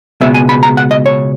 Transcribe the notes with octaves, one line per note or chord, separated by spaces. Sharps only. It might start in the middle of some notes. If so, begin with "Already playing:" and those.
C#2 B2 G#3 B3 E5
G#5
B5
A#5
F#5
D#5
C#5